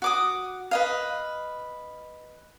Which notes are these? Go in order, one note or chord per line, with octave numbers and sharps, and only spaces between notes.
F#4 D6 D#6
B4 D#5 F5